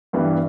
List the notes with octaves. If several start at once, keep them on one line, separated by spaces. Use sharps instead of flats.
G2 E3 G3 B3